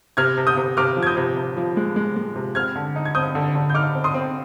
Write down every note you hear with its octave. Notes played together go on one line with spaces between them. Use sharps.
C3 F6 G#6
C3
D#6 G6
C3
C3 D6 F6
F3
G#6
D#6 G6
C3
C3
F3
G#3
G#3
G#3
C3
C4 F6 G#6
D3
D#4
G#6
C4 D#6 G6
D3
D3
G6
D#4 D6 F6
C4
C6 D#6
C4